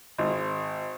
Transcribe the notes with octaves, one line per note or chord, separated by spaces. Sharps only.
G#1